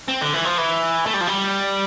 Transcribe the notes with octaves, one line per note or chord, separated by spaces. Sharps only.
C4
D3
E3
F3
E3
A3
G3
F3
G3